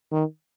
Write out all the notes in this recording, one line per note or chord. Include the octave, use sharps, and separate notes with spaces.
D#3